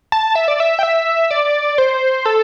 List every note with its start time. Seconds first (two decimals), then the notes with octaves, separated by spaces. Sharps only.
0.12 A5
0.35 E5
0.48 D5
0.60 E5
0.79 G5
0.83 E5
1.31 D5
1.78 C5
2.26 A4